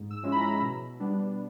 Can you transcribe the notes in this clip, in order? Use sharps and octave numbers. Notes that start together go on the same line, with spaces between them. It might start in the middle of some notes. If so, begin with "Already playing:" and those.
Already playing: G#2
E6
F3 G#3 C#4 E4
B5
A#5
B2
G3 B3 D4